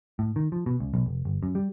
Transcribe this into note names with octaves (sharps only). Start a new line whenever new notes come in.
A2
D#3
F3
B2
C#2
B1
F1
G1
F#2
G3